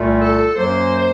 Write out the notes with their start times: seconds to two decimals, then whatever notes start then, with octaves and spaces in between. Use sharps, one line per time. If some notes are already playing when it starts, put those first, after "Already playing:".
Already playing: C2 A#2 A3
0.20 A4
0.56 F#2 F#3 A#3 C5